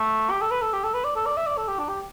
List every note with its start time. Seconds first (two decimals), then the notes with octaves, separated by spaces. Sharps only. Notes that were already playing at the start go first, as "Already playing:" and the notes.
Already playing: A3
0.30 G4
0.41 A4
0.51 B4
0.62 A4
0.73 G4
0.84 A4
0.94 B4
1.04 D5
1.16 A4
1.26 D5
1.37 E5
1.46 D5
1.57 A4
1.68 G4
1.79 D4
1.89 G4